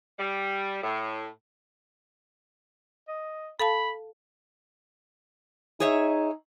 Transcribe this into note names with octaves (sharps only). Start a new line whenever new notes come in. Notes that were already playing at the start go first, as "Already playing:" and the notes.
G3
A2
D#5
A4 F5 A5 B5
D#4 G#4 C#5 E5